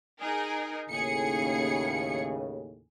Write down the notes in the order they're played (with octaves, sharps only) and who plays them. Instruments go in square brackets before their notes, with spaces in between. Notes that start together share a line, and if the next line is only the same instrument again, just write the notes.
[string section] D#4 G#4 A#4
[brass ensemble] D#2 A2 C#3 [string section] G#4 C#7